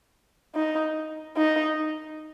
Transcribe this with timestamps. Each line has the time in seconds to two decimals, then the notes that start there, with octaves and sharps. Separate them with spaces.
0.55 D#4
1.37 D#4